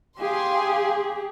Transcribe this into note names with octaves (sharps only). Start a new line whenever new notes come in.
G4 G#4 F5 G#5 C6